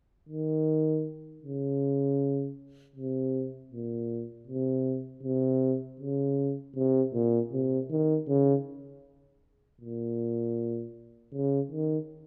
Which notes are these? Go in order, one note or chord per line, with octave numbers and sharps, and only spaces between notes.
D#3
C#3
C3
A#2
C3
C3
C#3
C3
A#2
C3
D#3
C#3
A#2
C#3
D#3